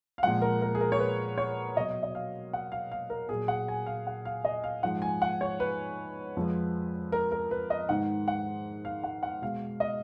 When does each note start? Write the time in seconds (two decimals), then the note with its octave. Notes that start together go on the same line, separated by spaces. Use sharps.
0.18 F5
0.23 A#2 F3 G#3 F#5
0.42 A#4
0.62 A#4
0.75 G#4
0.81 A#4
0.92 C#5
1.00 B4
1.38 C#5
1.76 B2 F#3 D#5
2.03 D#5
2.15 F5
2.53 F#5
2.72 F5
2.92 F5
3.10 A#4
3.29 A#2 F#3 G#4
3.48 F#5
3.68 G#5
3.86 F5
4.07 F#5
4.25 F5
4.45 D#5
4.64 F5
4.83 G#2 F3 G#3 F#5
5.02 G#5
5.22 F#5
5.41 C#5
5.60 B4
6.37 F2 F3 G#3
7.12 A#4
7.32 A#4
7.51 B4
7.70 D#5
7.89 G#2 D#3 G#3 F#5
8.28 F#5
8.85 F5
9.04 F#5
9.23 F#5
9.42 B2 G#3 F5
9.80 D#5